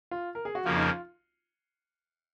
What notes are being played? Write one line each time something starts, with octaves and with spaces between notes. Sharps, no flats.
F4
A#4
G#4
F#4
F2 C#3 F3 A#3 F4
D#4
F4